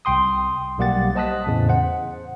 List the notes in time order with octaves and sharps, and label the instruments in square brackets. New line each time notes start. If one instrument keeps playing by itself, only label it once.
[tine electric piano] C2 G5 C6 D#6
B1 G3 A#3 G4 F#5 A6
C5 D#5 A5 D#6 F#6 B6
E2 A2 C#3
C5 F#5